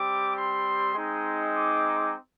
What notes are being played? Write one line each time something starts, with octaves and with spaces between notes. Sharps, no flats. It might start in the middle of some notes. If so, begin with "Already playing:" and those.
Already playing: G3 C4 G4 D6
C6
G#3 C4 D#4
D6